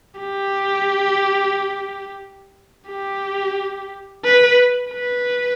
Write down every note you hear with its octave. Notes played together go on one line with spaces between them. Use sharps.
G4
G4
B4
B4